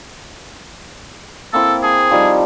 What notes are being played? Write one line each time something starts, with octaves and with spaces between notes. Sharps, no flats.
A#3 C4 E4 A4
G#4 A5
F3 G3 D#4